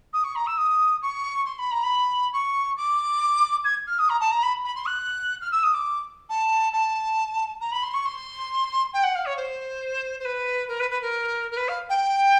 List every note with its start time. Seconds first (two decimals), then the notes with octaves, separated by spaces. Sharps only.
0.13 D#6
0.23 C#6
0.35 A#5
0.46 E6
0.57 D#6
1.01 C#6
1.45 C6
1.58 B5
1.71 A#5
1.83 B5
2.32 C#6
2.76 D6
3.64 G#6
3.86 F6
3.98 D#6
4.09 A#5
4.20 A5
4.31 A#5
4.42 B5
4.64 B5
4.74 C6
4.85 F#6
5.41 F6
5.51 E6
5.63 D#6
5.73 D6
6.29 A5
6.72 A5
7.60 A#5
7.71 B5
7.82 C6
7.93 C#6
8.05 C6
8.93 G5
9.03 F#5
9.15 F5
9.25 C#5
9.36 C5
10.19 C5
10.24 B4
10.68 A#4
10.79 B4
10.90 B4
11.01 A#4
11.51 A#4
11.56 B4
11.68 F5
11.89 G5